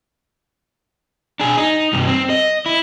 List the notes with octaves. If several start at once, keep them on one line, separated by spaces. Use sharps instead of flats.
D4 G#4
D#4
G2 C3
C4
D#5
E4